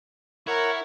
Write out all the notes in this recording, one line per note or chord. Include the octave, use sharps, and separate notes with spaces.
E4 A#4 C#5 F#5